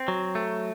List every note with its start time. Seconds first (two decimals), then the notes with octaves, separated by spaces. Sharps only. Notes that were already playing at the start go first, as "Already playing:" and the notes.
Already playing: C4
0.08 F#3
0.35 A3